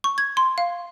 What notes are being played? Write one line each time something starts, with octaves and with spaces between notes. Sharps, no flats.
C#6
G#6
C6
F5